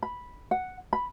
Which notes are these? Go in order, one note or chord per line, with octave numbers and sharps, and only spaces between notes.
B5
F#5
B5